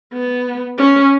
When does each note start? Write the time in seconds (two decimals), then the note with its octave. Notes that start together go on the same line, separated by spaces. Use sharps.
0.13 B3
0.78 C#4